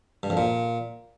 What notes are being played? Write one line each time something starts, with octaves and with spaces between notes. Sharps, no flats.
G2
F2
A#2